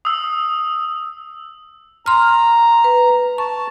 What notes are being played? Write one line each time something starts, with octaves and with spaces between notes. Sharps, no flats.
D#6 E6
A#5 C6 F6
B4
A5 C#6